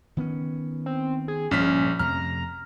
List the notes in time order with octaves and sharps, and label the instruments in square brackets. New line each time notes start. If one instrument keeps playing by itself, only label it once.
[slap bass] D#3 B3 C#4
[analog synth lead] C4
G#4
[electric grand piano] A#1 F6 B6 [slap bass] G2 A#2 [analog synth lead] C#4
[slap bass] F2 C3 A3 [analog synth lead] A#5 [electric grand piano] F6